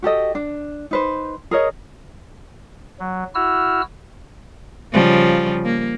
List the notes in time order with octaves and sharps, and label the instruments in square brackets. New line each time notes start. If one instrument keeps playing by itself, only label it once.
[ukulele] F#4 G4 A4 D#5
D4
D#4 B4 C5
G#4 A#4 C#5 D#5
[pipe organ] F#3
E4 F#4 E6 F6
[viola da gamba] C#3 F3 G3
A#3